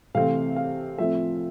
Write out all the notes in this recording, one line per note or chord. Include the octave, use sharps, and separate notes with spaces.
C3 E3 A3 C4 F5
F5
A2 F3 C4 E5